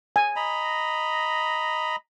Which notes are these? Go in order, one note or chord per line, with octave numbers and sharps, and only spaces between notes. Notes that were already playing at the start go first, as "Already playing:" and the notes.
G#5
D#5 A#5 B5